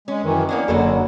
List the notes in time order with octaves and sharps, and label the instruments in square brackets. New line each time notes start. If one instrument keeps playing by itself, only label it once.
[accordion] G#3 [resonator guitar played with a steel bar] C#4
[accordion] F#2 D#3 E3
[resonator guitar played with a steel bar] A#3 C#4 D4 [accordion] B3
[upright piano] F#1 [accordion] D3 [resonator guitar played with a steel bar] F#3 F#4 A4